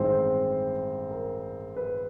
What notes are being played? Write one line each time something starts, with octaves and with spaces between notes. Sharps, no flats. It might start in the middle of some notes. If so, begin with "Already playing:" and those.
Already playing: A1 G2 D#3 G#3 C4 C5
A#4
B4